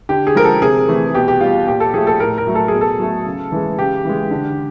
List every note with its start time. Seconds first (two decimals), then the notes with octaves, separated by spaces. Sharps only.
0.09 D3 G4
0.27 G#4
0.35 F3 G#3 A#4
0.44 A4
0.62 C3 G#4
0.88 E3 A3
1.15 B2 G4
1.28 G4
1.40 G3 F4
1.67 A#2 G4
1.80 A4
1.94 F3 A3 G#4
2.07 A4
2.20 A2 A#4
2.38 A#4
2.47 F#3 A3
2.55 A4
2.68 B2 G#4
2.81 A4
3.00 F#3 A3
3.26 C#3
3.52 E3 G#3
3.78 C#3 G4
4.05 E3 G#3
4.31 D3